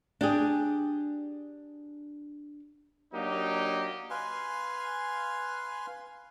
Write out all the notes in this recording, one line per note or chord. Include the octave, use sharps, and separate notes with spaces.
D4 G4 G#4
F#3 A#3 D4 D#4 G4
B4 F5 G#5 C6